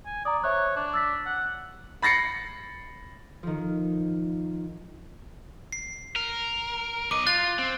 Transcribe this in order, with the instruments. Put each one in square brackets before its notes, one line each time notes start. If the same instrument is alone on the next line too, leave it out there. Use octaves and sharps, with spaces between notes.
[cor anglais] G#5
[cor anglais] D5 [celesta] A#5 D#6
[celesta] C5 E5 F#6 [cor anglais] C#5
[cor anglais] D4
[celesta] E6 A6 B6
[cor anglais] F#5
[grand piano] B5 A6 A#6 C7 C#7
[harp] D#3 F3
[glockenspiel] C7
[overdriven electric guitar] A#4
[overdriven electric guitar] B1 D#5 [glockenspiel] D6
[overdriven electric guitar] F4 [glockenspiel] F#6 A6
[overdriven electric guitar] C4